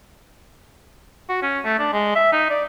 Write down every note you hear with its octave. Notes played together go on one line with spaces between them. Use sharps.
F#4
C#4
A3
D4
G#3
E5
D#4
D5